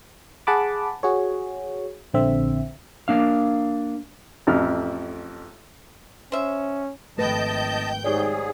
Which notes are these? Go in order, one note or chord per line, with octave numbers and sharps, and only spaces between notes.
G#4 F#5 A5 B5 D6
F#4 G#4 C#5
A#1 D3 C4 E5
A#3 D4 F5
A1 F2 F6
C#4 C5 E5
G#1 F3 A3 B4 D#5 G5 A5 G6
G#2 G4 G#4 C#5 D5